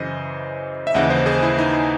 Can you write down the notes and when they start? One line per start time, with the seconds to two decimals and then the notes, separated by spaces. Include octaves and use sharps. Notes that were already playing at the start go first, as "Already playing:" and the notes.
Already playing: F#2 C#3 E3 C5 D#5
0.87 E5
0.94 D#2 C#3 E3 D#5 F#5
1.10 C5 D#5
1.26 G#4 C5
1.42 E4
1.58 D#4